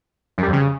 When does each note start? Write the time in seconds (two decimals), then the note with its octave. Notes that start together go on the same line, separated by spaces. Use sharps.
0.38 F#2
0.43 G3
0.48 F2
0.53 C#3